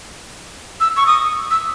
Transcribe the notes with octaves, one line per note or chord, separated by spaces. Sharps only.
E6
C#6
D#6
E6